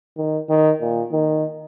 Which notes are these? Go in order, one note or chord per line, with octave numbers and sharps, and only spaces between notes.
D#3
D#3
A#2
D#3